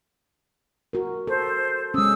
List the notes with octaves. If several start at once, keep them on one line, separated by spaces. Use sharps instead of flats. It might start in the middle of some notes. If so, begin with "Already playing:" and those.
F#4 A#4
A4 C5
G#3 C#4 D#6 E6